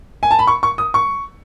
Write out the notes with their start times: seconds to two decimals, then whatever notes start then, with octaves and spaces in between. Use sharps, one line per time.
0.23 G#5
0.31 A5
0.39 B5
0.47 C#6
0.63 C#6
0.78 D#6
0.94 C#6